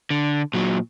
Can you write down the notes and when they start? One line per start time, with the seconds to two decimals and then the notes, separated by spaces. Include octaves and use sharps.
0.11 D3
0.54 A#2 F#3